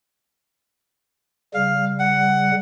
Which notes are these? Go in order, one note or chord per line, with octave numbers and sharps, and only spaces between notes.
C#3 G3 F5
F#5